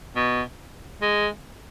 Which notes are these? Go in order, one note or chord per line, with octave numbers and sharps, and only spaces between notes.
B2
G#3